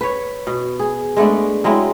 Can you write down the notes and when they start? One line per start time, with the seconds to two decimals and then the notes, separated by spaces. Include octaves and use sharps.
0.01 B4 C#5
0.47 B2
0.79 G#4
1.17 G#3 A3 B3 D4
1.64 F#3 G#3 C4 E4